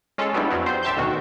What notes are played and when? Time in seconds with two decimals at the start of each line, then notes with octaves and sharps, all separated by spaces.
0.18 G#3 C#4 F4 A4
0.33 F#3 G3 B3 D4 E4
0.51 F2 F3 F#3 B3
0.66 G3 C5 G6
0.83 A1 G4 E5 A5 C6 G6
0.96 D2 B2 D#3 F#4